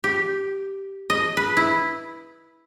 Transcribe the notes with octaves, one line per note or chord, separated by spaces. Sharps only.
G4
D#5
B4
E4